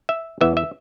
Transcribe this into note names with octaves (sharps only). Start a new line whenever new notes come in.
E5
E2 E3 B3 E5
E5